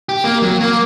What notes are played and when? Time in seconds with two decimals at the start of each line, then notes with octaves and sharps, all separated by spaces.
0.09 G4
0.24 A#3
0.43 F#3
0.61 A#3